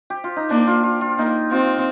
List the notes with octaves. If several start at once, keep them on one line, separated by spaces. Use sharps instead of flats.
G4
F4
D#4
A#3 D4
F4
F4
F4
A#3 D#4
C4 F4